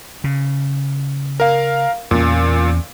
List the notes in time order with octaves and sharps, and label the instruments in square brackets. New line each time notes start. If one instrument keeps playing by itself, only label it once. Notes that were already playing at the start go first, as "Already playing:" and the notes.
[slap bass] C#3
[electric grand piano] A#4 F5
[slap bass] E2 C#4 [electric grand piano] A#2